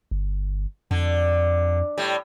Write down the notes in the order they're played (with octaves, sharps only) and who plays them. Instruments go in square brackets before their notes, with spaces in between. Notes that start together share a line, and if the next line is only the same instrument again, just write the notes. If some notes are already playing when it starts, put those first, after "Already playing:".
[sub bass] G1
[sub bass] F2 [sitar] D3
[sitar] A2 G3